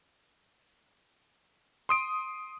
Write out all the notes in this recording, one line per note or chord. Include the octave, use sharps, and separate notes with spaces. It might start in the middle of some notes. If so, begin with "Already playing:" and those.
C6 D#6 D7